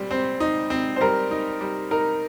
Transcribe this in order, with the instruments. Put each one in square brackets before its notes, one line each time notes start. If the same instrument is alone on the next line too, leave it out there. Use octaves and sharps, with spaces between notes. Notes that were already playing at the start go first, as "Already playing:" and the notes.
Already playing: [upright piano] A#2 G3 C4
[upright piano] C4 [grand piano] C5
[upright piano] D#4
C4
[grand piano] C5
[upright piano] G3 [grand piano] A#4
[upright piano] D#4
G3
[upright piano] D#4 [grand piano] A#4